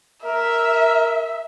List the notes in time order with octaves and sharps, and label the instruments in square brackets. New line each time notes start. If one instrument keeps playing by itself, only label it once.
[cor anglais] A#4 [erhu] E5